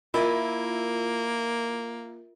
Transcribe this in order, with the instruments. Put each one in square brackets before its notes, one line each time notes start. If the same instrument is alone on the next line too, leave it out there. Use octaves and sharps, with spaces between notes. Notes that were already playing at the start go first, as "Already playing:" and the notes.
[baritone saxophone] A#3 [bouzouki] E4 [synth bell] F4 A#4 E5